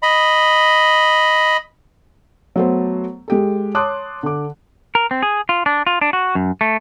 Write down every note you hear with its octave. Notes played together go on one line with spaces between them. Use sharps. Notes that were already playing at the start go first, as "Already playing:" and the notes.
D#5 B5
F#3 A3 B3 A4 C5
G#3 G4 A4
C#5 A5 C6 D6 D#6 F#6
D3 D6
A#4
C4
G#4
F4
D4
F4
D4
F#4
F#2
A3